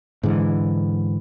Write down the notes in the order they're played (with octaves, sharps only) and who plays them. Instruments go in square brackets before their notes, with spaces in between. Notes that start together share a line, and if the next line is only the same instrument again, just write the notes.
[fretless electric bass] G#2 D3 E3